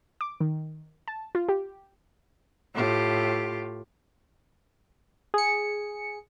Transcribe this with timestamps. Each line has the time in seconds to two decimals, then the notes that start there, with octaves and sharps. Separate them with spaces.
0.21 D6
0.40 D#3
1.08 A5
1.35 F4
1.49 G4
2.75 A2 F4 G4
5.34 G#4 C#7